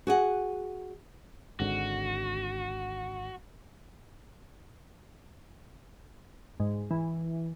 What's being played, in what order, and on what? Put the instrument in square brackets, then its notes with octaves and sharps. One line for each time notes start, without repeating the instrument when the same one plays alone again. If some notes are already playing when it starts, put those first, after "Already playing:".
[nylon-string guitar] F#4 G#4 F#5
[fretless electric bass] G#1 G#2 D3 [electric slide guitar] F#4
[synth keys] G#2
E3